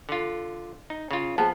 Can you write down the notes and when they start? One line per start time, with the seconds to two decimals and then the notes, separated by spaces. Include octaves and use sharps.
0.09 D3 F4
0.90 D#4
1.11 C#3 F4
1.38 F3 B3 G#4 A5